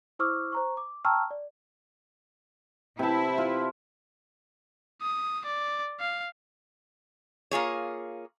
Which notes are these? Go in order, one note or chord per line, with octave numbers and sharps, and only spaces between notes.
E4 C5 C#6 D6 E6 F6
C5 A#5 C#6
D6
G5 A5 A#5 C#6 E6 F6
D5
C3 E4 A5
F4
D#6
D5
F5
A#3 F4 G#4 C#5